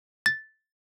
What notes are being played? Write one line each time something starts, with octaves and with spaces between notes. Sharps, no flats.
A6